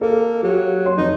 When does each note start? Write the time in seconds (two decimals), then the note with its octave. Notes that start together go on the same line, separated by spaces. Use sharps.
0.01 A#3 A4
0.43 F#3 G4
0.86 C#5 C6
0.97 F1 D#4